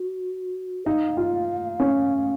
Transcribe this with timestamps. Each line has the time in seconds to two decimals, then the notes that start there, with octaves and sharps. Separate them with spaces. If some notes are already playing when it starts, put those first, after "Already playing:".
Already playing: F#4
0.85 D#4 F5
1.17 F4
1.80 C#4